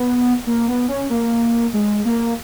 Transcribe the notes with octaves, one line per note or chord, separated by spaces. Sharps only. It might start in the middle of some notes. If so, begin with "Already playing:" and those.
Already playing: B3
A#3
B3
C#4
A#3
G#3
A#3